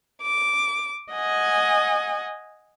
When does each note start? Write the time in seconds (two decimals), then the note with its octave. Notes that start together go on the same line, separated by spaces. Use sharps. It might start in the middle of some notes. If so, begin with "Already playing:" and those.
0.22 D6
1.13 D#5 F#5 G#5